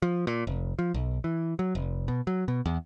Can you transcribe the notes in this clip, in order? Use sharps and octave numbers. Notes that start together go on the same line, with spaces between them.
F3
A#2
F1
F3
B1
E3
F#3
F1
B2
F#3
B2
E2